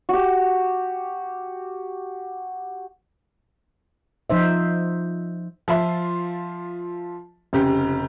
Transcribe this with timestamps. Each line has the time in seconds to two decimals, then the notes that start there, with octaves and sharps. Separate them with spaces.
0.09 F#4 G4
4.30 F3 D#4 C5 E5
5.68 F3 F4 E5 C6
7.53 F1 C#3 G4